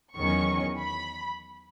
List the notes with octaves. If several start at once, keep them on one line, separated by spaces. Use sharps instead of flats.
E2 D#3 F#3 C#4 C#6
B5